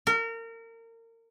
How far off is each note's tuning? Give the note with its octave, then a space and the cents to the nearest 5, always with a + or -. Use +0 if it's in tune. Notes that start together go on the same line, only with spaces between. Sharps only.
A#4 -30